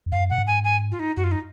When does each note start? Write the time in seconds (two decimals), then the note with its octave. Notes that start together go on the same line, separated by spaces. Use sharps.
0.06 F2
0.12 F#2 F5
0.30 A#2 F#5
0.38 G#2
0.47 G#5
0.64 G#5
0.91 F4
0.99 D#4
1.17 F#2 F#4
1.24 F4
1.31 D#4